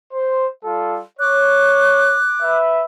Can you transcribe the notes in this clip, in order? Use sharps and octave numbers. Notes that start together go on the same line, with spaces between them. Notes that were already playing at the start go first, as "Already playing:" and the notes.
C5
G3 F4 A4
C#5 D6 F#6
B4 E5